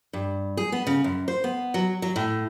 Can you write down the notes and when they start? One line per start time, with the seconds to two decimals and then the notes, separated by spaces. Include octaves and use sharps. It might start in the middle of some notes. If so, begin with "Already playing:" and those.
0.13 G2
0.57 G#4
0.72 B3
0.87 C#3
1.04 F#2
1.28 C5
1.44 B3
1.74 F#3
2.02 F#3
2.16 A2